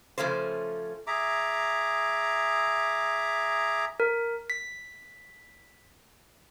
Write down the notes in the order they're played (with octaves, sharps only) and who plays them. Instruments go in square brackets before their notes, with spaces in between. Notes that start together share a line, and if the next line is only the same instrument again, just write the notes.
[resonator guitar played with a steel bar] C#3 F3 A3 C#4 C5
[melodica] G#4 E5 A#5 D6
[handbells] A#4
B6